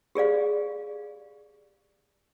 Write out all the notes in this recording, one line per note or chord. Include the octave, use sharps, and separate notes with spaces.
G4 G#4 D5 F5